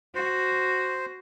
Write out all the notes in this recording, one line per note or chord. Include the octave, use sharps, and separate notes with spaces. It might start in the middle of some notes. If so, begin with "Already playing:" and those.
F#4 C5